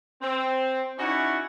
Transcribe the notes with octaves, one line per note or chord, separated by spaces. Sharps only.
C4
C#4 D#4 E4 F#4 D5 F#5